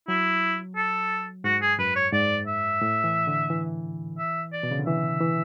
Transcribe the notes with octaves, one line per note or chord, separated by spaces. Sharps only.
F#3 E4
A4
G#2 F#4
G#4
F#2 B4
C#5
G#2 D5
E5
A2
E3
D3
E3
E5
D5
B2
C#3
D3
E3 E5
E3